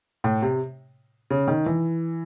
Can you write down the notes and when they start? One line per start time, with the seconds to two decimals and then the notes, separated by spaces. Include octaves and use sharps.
0.24 A2
0.42 C3
1.30 C#3
1.48 D#3
1.66 E3